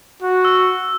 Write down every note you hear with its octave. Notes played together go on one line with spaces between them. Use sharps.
F#4
E6